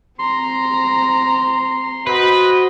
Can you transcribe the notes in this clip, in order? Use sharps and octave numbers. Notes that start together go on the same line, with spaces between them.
C4 A#5 C6
F#4 B4 C5 D#5